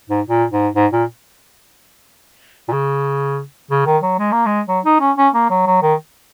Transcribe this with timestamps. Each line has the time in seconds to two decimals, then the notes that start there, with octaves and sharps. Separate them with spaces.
0.10 G#2
0.27 A#2
0.51 G#2
0.75 G#2
0.92 A#2
2.68 A#2
2.72 C#3
3.70 C#3
3.86 D#3
4.03 F#3
4.18 G#3
4.32 A#3
4.46 G#3
4.68 F#3
4.85 D#4
5.00 C#4
5.17 C#4
5.34 A#3
5.50 F#3
5.66 F#3
5.82 D#3